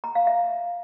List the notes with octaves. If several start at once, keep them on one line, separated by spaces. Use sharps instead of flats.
A#5
F5
E5